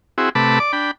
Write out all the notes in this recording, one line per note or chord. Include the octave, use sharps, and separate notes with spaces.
C4 E4 F#4 G#4
C3 A3 B4 A5 B5 D6
D5 D6
D4 G5 B5